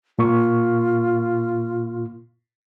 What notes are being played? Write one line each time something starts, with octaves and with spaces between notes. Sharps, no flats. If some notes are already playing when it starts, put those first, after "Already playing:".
A#2 A#3 F4 C#6